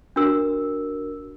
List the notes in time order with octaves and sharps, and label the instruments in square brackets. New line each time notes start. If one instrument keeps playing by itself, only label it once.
[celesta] D4 F#4 A#4 E6